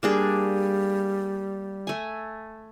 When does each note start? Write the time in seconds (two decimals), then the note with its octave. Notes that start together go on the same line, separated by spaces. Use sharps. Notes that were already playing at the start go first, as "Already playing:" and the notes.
0.03 G3 A#3 D4 G#4
1.87 A3 G#5